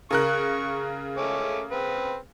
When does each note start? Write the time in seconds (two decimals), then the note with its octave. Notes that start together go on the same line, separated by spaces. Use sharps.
0.11 C#3 A#4 C#6 F#6
1.17 A3 C#4 D6
1.71 C4 B4